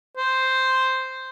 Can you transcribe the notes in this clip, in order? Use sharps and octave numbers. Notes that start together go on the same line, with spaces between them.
C5